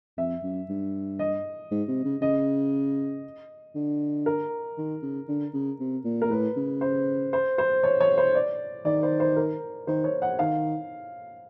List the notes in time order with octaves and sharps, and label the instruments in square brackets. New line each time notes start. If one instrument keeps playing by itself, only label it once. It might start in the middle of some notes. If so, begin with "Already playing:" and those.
[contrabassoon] F2 [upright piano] E5
[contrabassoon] F#2
G2
[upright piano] D#5
[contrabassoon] G#2
C3
C#3
[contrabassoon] C#3 [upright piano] D#5
[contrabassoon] D3
[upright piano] A#4
[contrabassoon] D#3
C#3
D3
C#3
C3
A#2
[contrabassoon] A#2 [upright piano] A#4
[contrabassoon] A2 [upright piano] B4
[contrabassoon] C#3
[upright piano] C5
C5
C5
C#5
C#5
C5
D5
[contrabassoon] D#3 [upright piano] D5
[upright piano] C5
C5
A#4
[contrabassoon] D#3 [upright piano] C5
[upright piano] C#5
F#5
[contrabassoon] D#3 [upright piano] F5